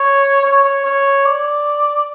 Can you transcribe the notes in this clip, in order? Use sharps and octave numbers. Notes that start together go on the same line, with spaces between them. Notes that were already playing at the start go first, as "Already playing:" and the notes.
Already playing: C#5
C#5
C#5
C#5
D5